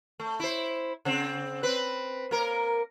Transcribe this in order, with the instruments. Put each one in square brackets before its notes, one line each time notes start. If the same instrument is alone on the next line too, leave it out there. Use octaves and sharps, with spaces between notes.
[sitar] A3
E4 C5
C#3 C4
C4 B4
A#3 A#4